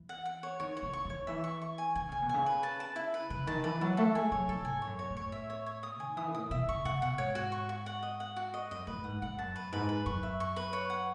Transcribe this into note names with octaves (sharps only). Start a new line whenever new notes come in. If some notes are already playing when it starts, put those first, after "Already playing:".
Already playing: E3
F#5
F#5
C#5
D#3 C#5
C#5
D#3
C#6
D#3 C#5
E3 E5
C#6
C#6
G#5
D#3 G#5
C#3 G#5
B2
C#3 G#5
B4
A5
A5
E4
B4
C#3 B4
D#3 A5
E3 B4
F#3 A5
A3 A4
G#3 G#5
F#3 C#5
E3 A4
G#2 G#5
C#5
F#2
C#5
A2
C#5
E5
C#5
C#5
D#6
D#3 G#5
E3 D#6
A2 D#6
B2 E5
C#3 C#6
C#3 F#5
B2 F#5
G#2 C#5
F#4
C#6
F#4
F#5
D#5
F#5
F#4
D#5
F#2 D#5
A2 B4
G#2 F#5
G#2 F#5
F#2 A5
B4
G#2 B4
B4
F#2 C#6
E5
C#6
B4
C#5
F#5